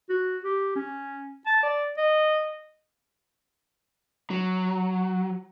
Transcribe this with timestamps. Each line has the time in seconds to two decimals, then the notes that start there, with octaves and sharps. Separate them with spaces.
0.10 F#4
0.44 G4
0.76 C#4
1.46 A5
1.63 D5
1.98 D#5
4.30 F#3